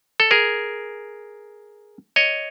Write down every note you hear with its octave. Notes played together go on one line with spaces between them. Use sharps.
A4
G#4 A#4
C#5 D#5